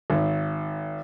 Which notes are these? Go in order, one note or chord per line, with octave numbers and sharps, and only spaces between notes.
G#1